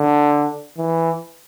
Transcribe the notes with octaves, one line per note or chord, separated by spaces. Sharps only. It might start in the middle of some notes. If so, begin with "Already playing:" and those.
Already playing: D3
E3